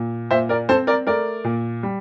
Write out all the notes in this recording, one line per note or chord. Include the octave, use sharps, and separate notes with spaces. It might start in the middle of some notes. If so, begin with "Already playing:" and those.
Already playing: A#2
A#2 C5 E5
A#4 D5
C4 A4 C5
A#4 D5
A3 A#4 D5
A#2
G3